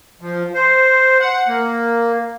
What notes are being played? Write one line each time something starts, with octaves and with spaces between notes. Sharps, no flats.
F3
C5
F#5
A#3